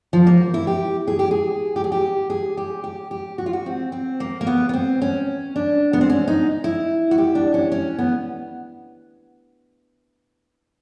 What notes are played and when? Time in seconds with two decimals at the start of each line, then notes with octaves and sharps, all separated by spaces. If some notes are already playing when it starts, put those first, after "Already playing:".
0.13 F3
0.27 A#3
0.54 E4
0.67 G4
1.07 G#4
1.19 G4
1.31 G#4
1.76 G4
1.84 G#4
1.92 G4
2.30 G#4
2.57 G4
2.84 G4
3.11 G4
3.38 F#4
3.46 F4
3.53 F#4
3.66 C4
3.92 C4
4.20 A#3
4.41 A#3
4.47 B3
4.69 B3
4.73 C4
5.02 C#4
5.56 D4
5.93 B3
6.01 C4
6.10 C#4
6.27 D#4
6.64 E4
7.11 F#4
7.18 G4
7.35 D4
7.54 C#4
7.72 C#4
7.98 B3